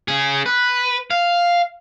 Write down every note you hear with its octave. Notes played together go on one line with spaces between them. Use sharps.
C#4 G#4
B4
F5